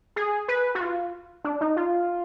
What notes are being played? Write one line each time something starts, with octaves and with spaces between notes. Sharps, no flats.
G#4
B4
F#4
F4
D4
D#4
F4